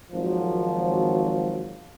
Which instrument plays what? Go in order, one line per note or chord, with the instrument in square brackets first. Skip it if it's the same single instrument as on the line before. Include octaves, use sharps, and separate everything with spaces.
[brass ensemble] G#1 F3 F#3